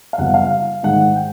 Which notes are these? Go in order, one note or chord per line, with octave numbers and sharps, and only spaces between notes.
F5
F#2 C#3 E3 G3 B3 F#5
F5
G#2 D#3 G#3 F#5
G5